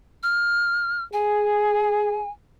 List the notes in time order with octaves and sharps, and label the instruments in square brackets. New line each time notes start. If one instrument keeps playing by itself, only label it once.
[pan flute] F6
[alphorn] G#4 [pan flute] G#5